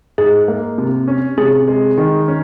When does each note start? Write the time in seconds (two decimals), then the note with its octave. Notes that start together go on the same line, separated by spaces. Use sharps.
0.18 G#2 G#4
0.48 A#3
0.78 C3
1.08 C#4
1.38 C3 G#4
1.68 G#3
1.98 D#3
2.28 C#4